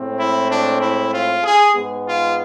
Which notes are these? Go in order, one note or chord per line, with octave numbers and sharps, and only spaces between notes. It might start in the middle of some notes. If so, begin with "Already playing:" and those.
Already playing: A2 G#3 C4
E4
D4
E4
F4
G#4
G#2 G#3 B3
F4